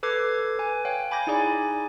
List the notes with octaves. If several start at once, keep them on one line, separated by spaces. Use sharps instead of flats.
A4 B4 D6 G#6 C7
B4 G#5
C#5 F5 G5
G#5 B5 D6 G6 A#6
D#4 E4 G#4 D5 G#5